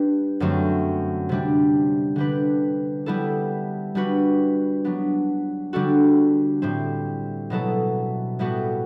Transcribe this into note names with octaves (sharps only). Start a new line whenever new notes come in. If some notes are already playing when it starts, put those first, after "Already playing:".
Already playing: G3 D4 G4 B4
F#2 D3 F#3 A3 C4
C3 G3 D4
D3 G3 D4 G4 B4
G3 B3 E4 A4
G3 D4 F#4 B4
F#3 B3 D4
D3 G3 D4 F#4 A4
A2 G3 C4
B2 F#3 B3 E4 A4
A2 G3 B3 F#4 A4